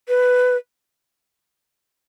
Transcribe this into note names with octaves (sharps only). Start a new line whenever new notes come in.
B4